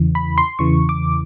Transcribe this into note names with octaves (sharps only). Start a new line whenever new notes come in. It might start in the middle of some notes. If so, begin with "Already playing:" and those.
Already playing: E2 C#3 E3
B5
C6
E2 C#3 E3 C#6
D6